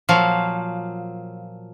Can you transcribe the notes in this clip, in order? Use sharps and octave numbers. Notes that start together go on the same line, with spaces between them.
A#2 F3 F#3 F5